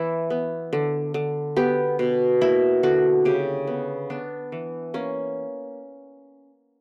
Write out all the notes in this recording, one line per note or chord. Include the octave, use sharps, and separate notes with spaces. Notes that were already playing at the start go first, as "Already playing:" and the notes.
Already playing: E3 E4
B3
D3
D3
B3 G4
B2
A#3 E4
D3 F#4
C#3 G4
B3
B3 D4
E3
A#3 C#4